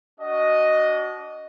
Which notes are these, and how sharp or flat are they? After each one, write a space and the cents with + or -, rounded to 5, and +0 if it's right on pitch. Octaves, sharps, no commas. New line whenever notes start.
D4 -30 F#4 +10 D#5 +0